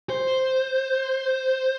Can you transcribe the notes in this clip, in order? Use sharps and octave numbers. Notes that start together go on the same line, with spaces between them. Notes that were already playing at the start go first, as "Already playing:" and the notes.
C5